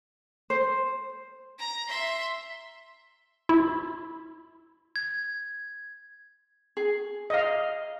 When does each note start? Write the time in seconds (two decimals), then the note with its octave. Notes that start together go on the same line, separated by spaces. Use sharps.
0.50 C5
1.59 A#5
1.89 E5 C6
3.49 E4
4.96 G#6
6.77 G#4
7.30 D#5 F5